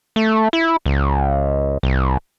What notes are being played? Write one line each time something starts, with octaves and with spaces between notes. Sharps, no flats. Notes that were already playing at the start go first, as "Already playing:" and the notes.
A3
E4
C#2
C2